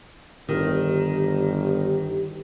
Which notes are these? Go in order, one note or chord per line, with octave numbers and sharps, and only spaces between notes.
G1 D#3 G4